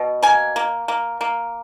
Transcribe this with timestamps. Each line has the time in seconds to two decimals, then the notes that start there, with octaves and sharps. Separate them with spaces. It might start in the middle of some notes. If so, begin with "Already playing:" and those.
Already playing: B2
0.23 A#3 G#5
0.56 A#3
0.88 A#3
1.21 A#3